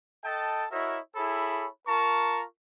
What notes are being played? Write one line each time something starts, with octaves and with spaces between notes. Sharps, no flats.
A4 D#5 G5 A5
E4 F#4 A#4 C#5 D#5 E5
E4 G#4 A4 C#5 B5
F4 A#4 A5 A#5 C#6